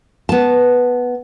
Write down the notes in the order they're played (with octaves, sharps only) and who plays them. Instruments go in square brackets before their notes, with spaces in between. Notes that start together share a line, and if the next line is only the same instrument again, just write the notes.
[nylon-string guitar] B3 A5